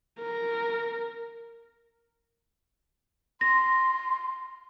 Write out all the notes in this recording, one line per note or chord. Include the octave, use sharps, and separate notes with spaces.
A#4
C6 A#6